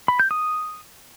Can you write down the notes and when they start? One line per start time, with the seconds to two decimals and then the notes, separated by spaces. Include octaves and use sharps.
0.08 B5
0.20 G6
0.31 D#6